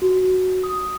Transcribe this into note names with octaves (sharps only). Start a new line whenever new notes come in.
F#4
D#6